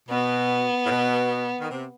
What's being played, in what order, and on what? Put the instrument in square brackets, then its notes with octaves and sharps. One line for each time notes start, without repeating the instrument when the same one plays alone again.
[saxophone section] B2 [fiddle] B3
[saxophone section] A2
B2
D#3
C3